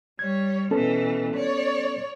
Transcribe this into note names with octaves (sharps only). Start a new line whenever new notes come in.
G3 C#5 G#6
B2 E3 B3 C#4 A4
C#5 D5